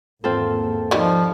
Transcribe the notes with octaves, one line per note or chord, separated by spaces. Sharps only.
G#1 E2 A#3 C4 F4 A4
D#3 F3 G3